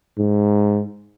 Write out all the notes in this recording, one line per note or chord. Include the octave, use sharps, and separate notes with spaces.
G#2